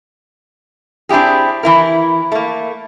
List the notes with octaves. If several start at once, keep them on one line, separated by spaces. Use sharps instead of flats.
C4 D4 E4 G4 G#4
E3 E4 A#4
A3 A#3